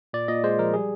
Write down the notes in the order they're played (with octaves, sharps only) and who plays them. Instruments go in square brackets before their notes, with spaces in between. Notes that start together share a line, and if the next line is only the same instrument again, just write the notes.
[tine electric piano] A#2 D5
A#2 D#5
G#3 C5
F3 A#4
G3 G#4